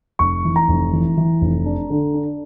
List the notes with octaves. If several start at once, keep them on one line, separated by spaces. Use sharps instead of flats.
F1 C#6
E3
A#5
F1
E3
E3
F1
D4
D3
D4